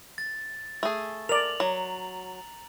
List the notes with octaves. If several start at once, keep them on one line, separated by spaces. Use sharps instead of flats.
A6
A3 G#4
A#4 D5 F7 F#7
F#3 A#5